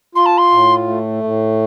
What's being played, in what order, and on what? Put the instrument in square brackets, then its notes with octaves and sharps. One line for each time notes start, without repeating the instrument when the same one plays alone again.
[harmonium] F4 [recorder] C6
[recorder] A5
C6
[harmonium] A2
A3
A2